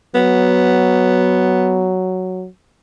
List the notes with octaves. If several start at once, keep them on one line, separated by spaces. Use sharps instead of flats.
F#3 B3